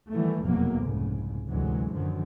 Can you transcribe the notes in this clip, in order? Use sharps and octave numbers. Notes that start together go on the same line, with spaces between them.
D#3 E3 F#3 G3 A3
F1 E2 B2 F#3 G#3 A#3
F1 C2 G#2 C#3
A1 D2 C3 E3 F#3 G#3
F#2 D3 D#3 F3 F#3